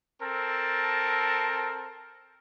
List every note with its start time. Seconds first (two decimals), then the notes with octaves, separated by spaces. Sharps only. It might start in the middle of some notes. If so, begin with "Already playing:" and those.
0.22 C4 A4 A#4 A5